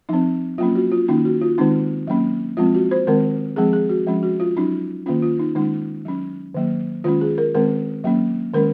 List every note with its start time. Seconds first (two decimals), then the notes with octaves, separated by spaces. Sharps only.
0.09 F3 C4 D#4
0.58 F#3 A#3 C#4 F4
0.75 F#4
0.92 F4
1.08 D#3 A#3 C#4 D#4
1.25 F#4
1.41 F4
1.58 D#3 G#3 C4 D#4
2.07 F#3 A#3 C#4
2.57 F3 G#3 C4 F4
2.75 F#4
2.91 C5
3.07 D#3 G#3 C4 A#4
3.56 F3 G#3 C4 G#4
3.73 G#4
3.90 F#4
4.07 F3 G#3 C#4
4.23 F#4
4.40 F4
4.57 F#3 C#4 D#4
5.06 D#3 A#3 C#4 F4
5.22 F4
5.39 D#4
5.55 D#3 G#3 C#4 D#4
6.05 F#3 C#4
6.55 D#3 F#3 A#3
7.04 D#3 G#3 C#4 F4
7.21 G#4
7.38 A#4
7.55 D#3 G#3 C4 A#4
8.04 F#3 A#3 C#4
8.53 D#3 G#3 C#4 A#4